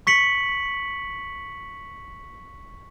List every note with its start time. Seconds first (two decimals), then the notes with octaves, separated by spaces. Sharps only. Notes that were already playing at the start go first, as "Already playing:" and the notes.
0.07 C#6 B6 C#7 F#7